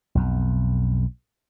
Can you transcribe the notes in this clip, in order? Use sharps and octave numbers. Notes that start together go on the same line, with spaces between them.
B1 F2